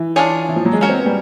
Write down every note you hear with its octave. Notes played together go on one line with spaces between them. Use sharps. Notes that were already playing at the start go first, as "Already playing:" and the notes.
Already playing: E3
D4 F4 G#4 C#5
E3
F3
F#3
G#3
C#4 F#4 A#4 C#5
C4
B3
G3